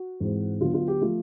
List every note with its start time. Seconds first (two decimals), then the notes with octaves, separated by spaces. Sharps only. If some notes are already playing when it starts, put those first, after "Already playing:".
Already playing: F#4
0.20 G#2 E3 G#3 C4
0.61 D3 F#3 B3 F4
0.74 F4
0.88 G4
1.01 F3 A3 F4